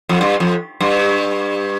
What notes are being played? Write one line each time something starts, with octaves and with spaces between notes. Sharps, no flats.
F2
G2
F2
G2